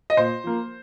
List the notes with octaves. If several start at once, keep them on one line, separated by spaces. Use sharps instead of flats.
D#5
A#2 C5
F3 A#3